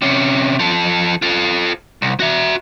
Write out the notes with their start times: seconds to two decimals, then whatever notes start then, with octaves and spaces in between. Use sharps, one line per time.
0.02 C3 C#4
0.59 F3 A4
1.22 F4 A4
2.02 C2
2.20 F#4 E5